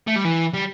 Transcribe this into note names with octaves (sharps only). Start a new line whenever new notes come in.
A3
G3
E3
G3